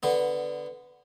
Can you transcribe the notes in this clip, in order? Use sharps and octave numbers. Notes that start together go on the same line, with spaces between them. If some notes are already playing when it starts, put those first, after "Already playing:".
D3 B3